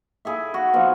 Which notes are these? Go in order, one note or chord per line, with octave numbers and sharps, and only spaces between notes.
E4 G#4 A4 E5
F#4
F3 B3 D#4